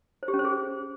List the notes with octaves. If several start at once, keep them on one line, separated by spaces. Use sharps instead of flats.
C5
G4
C#4
C5
G#4